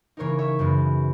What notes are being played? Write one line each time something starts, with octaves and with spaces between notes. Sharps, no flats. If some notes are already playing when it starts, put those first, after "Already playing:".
C#3 E3 A#3 D#4 A#4 C#5
C#5 E5
F#2 C#3 G#3 B3